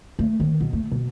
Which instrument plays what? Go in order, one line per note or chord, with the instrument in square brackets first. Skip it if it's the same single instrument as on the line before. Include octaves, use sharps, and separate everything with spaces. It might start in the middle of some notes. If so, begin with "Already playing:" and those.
[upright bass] A3
D#3
B2
A3
B2